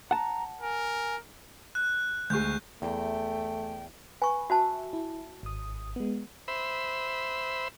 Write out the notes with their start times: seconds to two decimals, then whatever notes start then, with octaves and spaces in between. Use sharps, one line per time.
0.11 F#5 A5 A#5
0.61 A#4 G#5
1.75 F#6
2.30 D2 G#3 C#6 G6
2.82 E2 A3 G5
4.22 B4 G#5 C#6
4.50 F#4 C5 E5 A5
4.93 E4
5.43 G#1 D#6
5.96 G#3 B3
6.48 C5 E5 B5